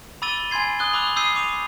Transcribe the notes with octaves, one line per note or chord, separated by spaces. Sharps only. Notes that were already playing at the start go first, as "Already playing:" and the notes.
B5 D6 E6 A6 D#7 G7
G#5 B5 C6 G#6 C7
D#6 F#6 G7
B5 D6 E6 F#6 F7
D#6 E6 G6 C7 D#7
D6 F7